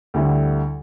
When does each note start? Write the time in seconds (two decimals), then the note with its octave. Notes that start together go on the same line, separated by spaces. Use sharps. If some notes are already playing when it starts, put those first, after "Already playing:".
0.14 D2 D3 G3 E4